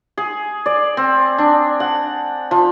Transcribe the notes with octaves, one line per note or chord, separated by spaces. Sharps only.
G#4
D5
C4
D4
F#5
F3